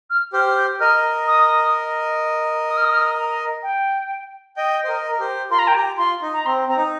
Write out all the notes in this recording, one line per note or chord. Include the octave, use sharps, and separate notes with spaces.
F6
G4 C5 F6
F6
G6
A#4 D#5 F6
D#6
D#6
F6
D#6
F6
D#6
A#5
G5
D#5 G5
C5
A#4 D#5
A#4
G4 C5
F4 A#4 C6
A#5
G5
G4 A#5
F4 C6
D#4
A#5
C4 C6
C4 A#5
D#4